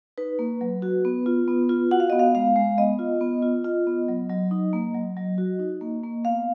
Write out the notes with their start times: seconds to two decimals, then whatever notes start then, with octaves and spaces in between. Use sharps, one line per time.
0.18 D#4 B4
0.39 A#3
0.61 F#3
0.82 F#4
1.05 B3
1.26 F4
1.48 B3
1.69 F4
1.91 F#4 F#5
2.00 F5
2.10 B3 D#5
2.19 F5
2.35 G#3 F5
2.56 G#3
2.78 B3 D#5
2.99 F4
3.21 B3
3.43 F4
3.64 F4
3.87 B3
4.08 F#3
4.29 F#3
4.51 D#4
4.73 A#3
4.94 F#3
5.17 F#3
5.38 F#4
5.59 D#4
5.81 A#3
6.04 A#3
6.25 B3 F5